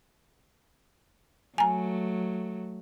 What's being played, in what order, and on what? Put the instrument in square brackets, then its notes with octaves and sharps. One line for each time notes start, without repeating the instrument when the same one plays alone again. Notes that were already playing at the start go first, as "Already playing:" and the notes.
[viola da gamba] F#3 A3 [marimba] G#5 A#5